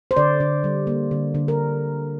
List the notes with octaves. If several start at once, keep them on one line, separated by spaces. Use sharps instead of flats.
C5
D3 D5
D3
G3
A#3
D3
D3
A#4